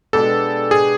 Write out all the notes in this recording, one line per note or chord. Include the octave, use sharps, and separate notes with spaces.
B2 G#3 B3 D4 G4 A4
G#4